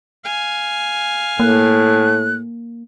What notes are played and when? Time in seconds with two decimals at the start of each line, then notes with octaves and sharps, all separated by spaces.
0.24 F5 G#5
1.40 A2 A#3 F#6